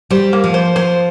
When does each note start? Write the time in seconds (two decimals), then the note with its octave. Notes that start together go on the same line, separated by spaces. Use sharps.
0.10 G3 C5
0.33 A#3
0.44 F3
0.54 C5
0.76 F3 C5